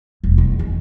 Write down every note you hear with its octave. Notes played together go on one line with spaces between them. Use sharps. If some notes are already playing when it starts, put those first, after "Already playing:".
E1
E2
D#3